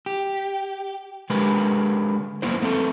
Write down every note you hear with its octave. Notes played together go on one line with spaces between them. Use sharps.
G4
D3 G#3 G4 A#4 B4
F#2 D#3 A#3 B3 E4 C5
A3 B3 C4 G#4 A4